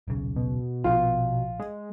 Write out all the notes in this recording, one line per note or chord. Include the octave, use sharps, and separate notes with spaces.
D#1 B1 C#3
B2
A#1 F3 F4
G#3